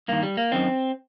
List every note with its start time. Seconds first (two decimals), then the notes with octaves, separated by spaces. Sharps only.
0.08 G2 D#3 A#3
0.23 G3
0.37 A#3
0.52 F#2 D#3 C4